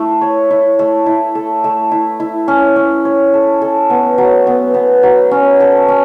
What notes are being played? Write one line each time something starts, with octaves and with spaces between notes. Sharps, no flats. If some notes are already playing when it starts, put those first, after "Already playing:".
Already playing: A3 E4
C#5
E4
A3
E4
A4
A3
E4
E4
C#4
C#4
C#5
A4
A4
B3
F#3
B3
B3
F#3
C#4
A4
C#4